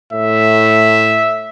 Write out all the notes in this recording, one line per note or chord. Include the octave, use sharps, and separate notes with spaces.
A2 E5